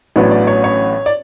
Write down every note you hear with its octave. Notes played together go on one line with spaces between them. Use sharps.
A1 A2 F#3 B3 D4 C#5
D5
C#5
C#5
D5